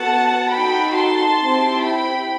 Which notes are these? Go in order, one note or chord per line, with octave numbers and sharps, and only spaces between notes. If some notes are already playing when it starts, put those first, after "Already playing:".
Already playing: B3 F#4 A4 F#5 A5
D#4 F#4 A4 G5 B5
A5 C6
C4 E4 G4
G5 B5